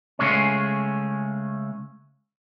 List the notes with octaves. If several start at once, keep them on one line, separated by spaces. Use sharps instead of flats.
C#3 G#3 A3 C#4